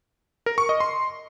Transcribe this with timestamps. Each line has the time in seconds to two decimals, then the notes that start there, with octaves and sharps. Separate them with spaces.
0.46 A#4
0.58 C#6
0.69 D#5
0.80 C6